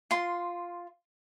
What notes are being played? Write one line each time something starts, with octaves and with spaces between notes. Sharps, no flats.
F4 C6